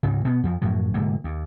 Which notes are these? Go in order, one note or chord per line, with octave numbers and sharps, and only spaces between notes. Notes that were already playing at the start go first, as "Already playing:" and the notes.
D2 G#2 C#3
B2 B3
F2 F3
F#2 A2 F3 F#3
F1 G#2 D3 A#3
D#2